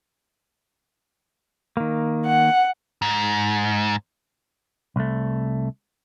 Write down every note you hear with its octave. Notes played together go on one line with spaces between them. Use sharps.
D#3 A#3
F#5
G#2
C2 A3